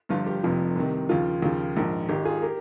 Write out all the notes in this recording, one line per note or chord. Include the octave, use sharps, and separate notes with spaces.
G1 G2 F3 F4
G4
F1 F2 C3 F3
C2 C3 D#3
D#2 C#3 F3 F4
D#2 C#3 F3
A#1 G#2 D#3
G#1 G#2 D#3 G4
F4 G#4
G4 A#4